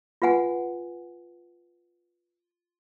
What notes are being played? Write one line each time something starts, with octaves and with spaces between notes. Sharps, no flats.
F4 B4 F#5 G#5